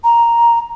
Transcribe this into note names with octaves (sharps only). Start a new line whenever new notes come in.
A#5